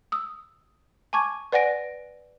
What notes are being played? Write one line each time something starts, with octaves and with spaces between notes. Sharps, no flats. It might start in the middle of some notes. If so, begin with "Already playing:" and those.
D#6 E6
G#5 A5 C#6 D6 G#6
B4 D5 F#5 G#5 A#6 D7